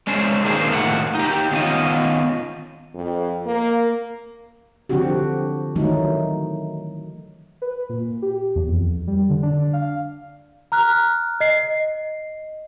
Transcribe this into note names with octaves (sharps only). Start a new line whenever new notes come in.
G#3 C#4 D4 G#4 C5
D#3 A#3 D4 G#4 C5
D#2 A2 D#3 F3 G4 F#5
D#4 G4
D#3 B3 C#4 F4 D#5
F2
A#3
D3 F3 C4 D4 F#4 G4
D#3 E3 F#3 A3 D#4
B4
A#2
G4
E2
F2
G3
D3
D4
F5
A#5 F6 F#6
D#5 C7